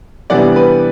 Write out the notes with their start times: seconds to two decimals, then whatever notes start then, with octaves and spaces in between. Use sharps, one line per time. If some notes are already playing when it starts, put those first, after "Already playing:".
0.30 C3 E3 G3 B3 D4 D5 F#5
0.56 B4